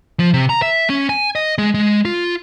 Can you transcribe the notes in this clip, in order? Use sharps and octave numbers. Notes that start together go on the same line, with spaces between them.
F3
C3
A#5
E5
C#4
G#5
D#5
G#3
G#3
F4